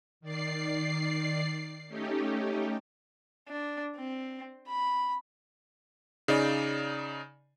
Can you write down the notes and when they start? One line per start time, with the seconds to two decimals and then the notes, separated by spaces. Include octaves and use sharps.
0.20 D#3 D5 C7
1.88 A3 C#4 D#4 G4
3.49 D4
3.96 C4
4.68 B5
6.28 C#3 D#4 D5